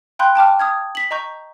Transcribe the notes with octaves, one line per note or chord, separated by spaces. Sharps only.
F5 G5 B5 C6 F#6 G6
G5 A5 D6 F6
D#6 F6 G#6
B6 F#7
D#5 A#5 C#6 G6